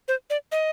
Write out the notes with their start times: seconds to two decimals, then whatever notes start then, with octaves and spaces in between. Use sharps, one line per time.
0.08 C5
0.30 D5
0.52 D#5